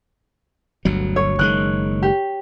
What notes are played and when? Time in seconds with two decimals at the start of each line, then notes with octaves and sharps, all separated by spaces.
0.85 G1 D2 F#3
1.16 C#5
1.39 F#1 D#3 G#3 F#6
2.03 G4